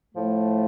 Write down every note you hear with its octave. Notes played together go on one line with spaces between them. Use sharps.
A2 F3 A3